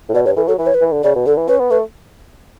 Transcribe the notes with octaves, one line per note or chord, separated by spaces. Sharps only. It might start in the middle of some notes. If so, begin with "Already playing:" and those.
A2
B2 D5
G2 C#5
E3 A4
F#3 A4
E3 B4
C#5
B4
E3
D3
C#3 D5
B2
D3 A4
E3
C#4 B4
B3
A3 B4